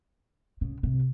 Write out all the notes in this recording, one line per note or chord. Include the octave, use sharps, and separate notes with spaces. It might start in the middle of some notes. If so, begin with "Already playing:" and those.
C#3
C3